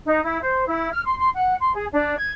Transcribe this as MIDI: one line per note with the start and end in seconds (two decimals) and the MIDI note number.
0.05 0.21 63
0.23 0.39 64
0.40 0.65 72
0.65 0.88 64
0.92 1.04 89
1.04 1.15 84
1.18 1.28 84
1.34 1.53 78
1.59 1.71 84
1.73 1.84 68
1.91 2.15 62
2.17 2.31 92